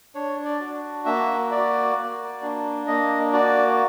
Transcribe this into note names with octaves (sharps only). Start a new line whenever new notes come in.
D4 C#5
D5
F#4
A#3 E5
F#4 D5
A#3
D4
A#3 D#5
F#4 D5